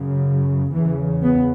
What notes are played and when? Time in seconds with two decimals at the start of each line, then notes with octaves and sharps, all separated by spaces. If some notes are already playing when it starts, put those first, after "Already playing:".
Already playing: F#2 C#3
0.72 E2 C#3 E3
1.22 B3